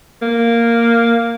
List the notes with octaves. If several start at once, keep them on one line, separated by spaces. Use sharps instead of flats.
A#3